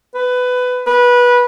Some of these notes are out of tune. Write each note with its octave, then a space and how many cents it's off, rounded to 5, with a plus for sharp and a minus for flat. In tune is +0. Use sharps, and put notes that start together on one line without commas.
B4 +15
B4 -20